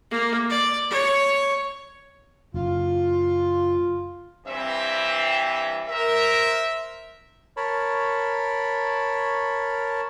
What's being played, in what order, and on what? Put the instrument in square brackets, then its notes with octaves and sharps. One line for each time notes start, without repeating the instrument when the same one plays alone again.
[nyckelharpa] A#3
D5
C#5
[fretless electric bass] F#1 [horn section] F4
[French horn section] G2 E3 C4 [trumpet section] E5
[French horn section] A#4 [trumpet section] C5 E5
[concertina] A#4 C#5 A5 B5